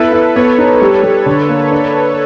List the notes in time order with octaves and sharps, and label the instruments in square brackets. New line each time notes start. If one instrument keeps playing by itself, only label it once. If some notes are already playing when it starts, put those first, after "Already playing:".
Already playing: [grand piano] B3 E4 [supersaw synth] A4 B4
[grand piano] E4
[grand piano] B3 [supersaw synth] B4 C#5
[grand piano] D#4
G3
G3
D3
A#3
D4